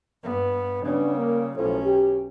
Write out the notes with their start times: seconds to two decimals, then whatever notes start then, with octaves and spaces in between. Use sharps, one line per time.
0.23 G2 B3
0.83 C#3 G3 B3 C#4 D4
1.16 A#3
1.56 B1 A2 F3 C#4
1.85 G4